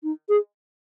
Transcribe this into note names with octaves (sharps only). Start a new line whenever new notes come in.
D#4
G#4